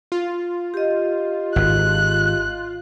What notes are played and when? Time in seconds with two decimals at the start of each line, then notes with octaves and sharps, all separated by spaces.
0.12 F4
0.74 G4 D#5
1.56 G#1 F#6